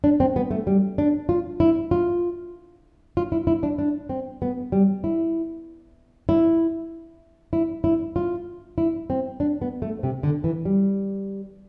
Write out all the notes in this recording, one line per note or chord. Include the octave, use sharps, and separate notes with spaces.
D4
C4
B3
A3
G3
D4
F4
E4
F4
F4
E4
E4
D4
D4
C4
B3
G3
E4
E4
E4
E4
F4
E4
C4
D4
B3
A3
C3
D3
E3
G3